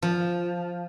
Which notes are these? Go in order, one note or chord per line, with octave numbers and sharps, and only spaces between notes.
F3